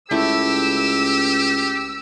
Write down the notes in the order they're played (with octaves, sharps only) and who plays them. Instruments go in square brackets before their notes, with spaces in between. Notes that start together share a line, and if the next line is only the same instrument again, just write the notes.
[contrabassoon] C#2 [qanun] A3 E4 [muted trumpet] G4 [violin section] E6